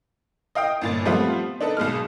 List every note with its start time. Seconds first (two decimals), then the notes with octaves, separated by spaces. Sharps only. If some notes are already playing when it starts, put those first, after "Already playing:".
0.55 D#5 F5 G5 D#6
0.82 G1 A#2 A6
1.05 F3 G3 A3 B3 C4 F4
1.61 D4 D#4 A4 B4
1.77 B1 B2 G#3 F6